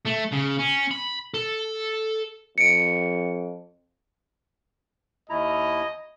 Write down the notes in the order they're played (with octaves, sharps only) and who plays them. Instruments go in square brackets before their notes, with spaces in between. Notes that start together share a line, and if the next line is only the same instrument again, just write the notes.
[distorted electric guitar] A3
C#3
C#4
B5
A4
[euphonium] F2 [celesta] C#7 D7
[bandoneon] D#2 E4 A#5 [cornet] D#5